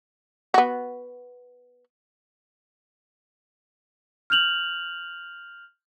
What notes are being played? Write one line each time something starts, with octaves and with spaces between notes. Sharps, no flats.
B3 F#4
F6 G6 F7 F#7